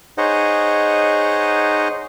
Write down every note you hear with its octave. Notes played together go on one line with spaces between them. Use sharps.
D#4 G#4 C5 C#5 D#5 F#5